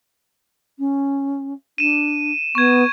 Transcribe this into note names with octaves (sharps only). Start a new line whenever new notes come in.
C#4
D4 D#7 E7
B3 C#6 G#6